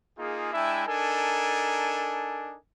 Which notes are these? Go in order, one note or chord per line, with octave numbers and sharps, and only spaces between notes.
A#3 D#4 F4 G#4
G#3 D4 E4 E5 G5 G#5
D4 D#4 A4 A#4 G#5